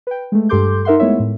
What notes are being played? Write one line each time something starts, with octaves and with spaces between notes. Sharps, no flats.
B4 G5
G#3 A3
G2 G4 A4 C6 D6 G6
D#4 A#4 E5 F#5 C6
G#3 A3 B3 E4 C#5 E5
A2